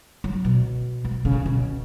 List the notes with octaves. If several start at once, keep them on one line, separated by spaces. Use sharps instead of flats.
F#3
B2
B2
C#3
B2